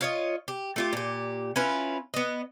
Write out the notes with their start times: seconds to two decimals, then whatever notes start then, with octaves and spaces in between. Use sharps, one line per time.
0.01 F4 C#5 D#5
0.48 G4
0.76 A3 F4 G4
0.93 A#2 G4
1.56 C#4 E4 F4 B4
2.14 B3 D#5